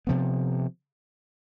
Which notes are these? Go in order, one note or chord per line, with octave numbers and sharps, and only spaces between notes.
C3 F3 B3